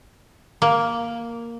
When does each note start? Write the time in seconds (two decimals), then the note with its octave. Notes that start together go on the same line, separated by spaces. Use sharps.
0.62 A#3